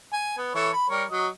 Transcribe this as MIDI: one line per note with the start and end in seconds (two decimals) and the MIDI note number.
0.13 0.36 80
0.38 0.52 59
0.55 0.69 52
0.55 0.69 69
0.55 0.69 73
0.73 0.89 83
0.90 1.04 55
0.90 1.04 70
0.90 1.04 73
1.11 1.27 54
1.11 1.27 75